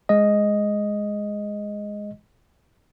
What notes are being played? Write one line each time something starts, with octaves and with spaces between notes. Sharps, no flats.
G#3 D#5